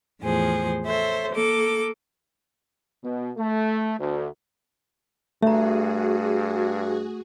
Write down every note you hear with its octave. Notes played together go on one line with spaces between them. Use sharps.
E2 A2 F3 G#4 C5
A4 C5 C#5 E5
A#3 A4 D6
B2
A3
D2
G2 A3 F#4 G#4 E5 A#5